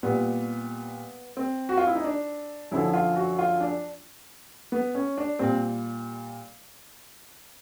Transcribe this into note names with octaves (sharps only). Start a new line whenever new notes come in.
A#2 G3 B3
C4
F#4
F4
E4
D#4
D4
F#2 D3 F3 E4
F4
F#4
F4
D4
B3
C#4
D4
A#2 G3 C4